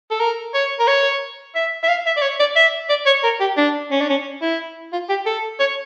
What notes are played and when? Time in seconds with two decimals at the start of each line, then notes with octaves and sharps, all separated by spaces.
0.11 A4
0.20 A#4
0.54 C#5
0.80 A#4
0.88 C#5
1.55 E5
1.84 E5
1.89 F5
2.06 E5
2.17 D5
2.22 C#5
2.40 D5
2.56 E5
2.89 D5
3.06 C#5
3.24 A#4
3.40 G4
3.57 D4
3.91 C#4
4.01 D4
4.10 C#4
4.42 E4
4.93 F4
5.09 G4
5.26 A4
5.60 C#5